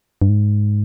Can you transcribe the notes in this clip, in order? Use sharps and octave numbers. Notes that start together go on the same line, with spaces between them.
G2
G#2